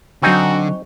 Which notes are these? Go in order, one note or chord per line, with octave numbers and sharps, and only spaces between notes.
D3 F#3 C4 D#4 F#4 G#5 C#6